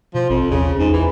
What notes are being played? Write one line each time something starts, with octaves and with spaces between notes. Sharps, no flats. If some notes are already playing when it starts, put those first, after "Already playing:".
B2 F3
A1 F2
D#2 C#3
E2 G#2
E3